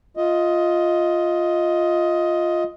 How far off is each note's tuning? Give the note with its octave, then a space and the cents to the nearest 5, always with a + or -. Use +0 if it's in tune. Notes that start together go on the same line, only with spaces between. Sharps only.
F4 +0 D#5 +10